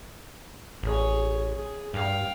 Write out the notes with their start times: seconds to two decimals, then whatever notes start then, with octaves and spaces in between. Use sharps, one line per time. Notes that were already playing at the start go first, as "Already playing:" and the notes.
0.83 A1 G#4 C#5
1.52 G#4
1.94 G2 F5 G5